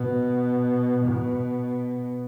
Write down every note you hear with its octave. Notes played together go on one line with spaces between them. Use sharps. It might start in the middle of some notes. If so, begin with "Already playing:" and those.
Already playing: B2
B2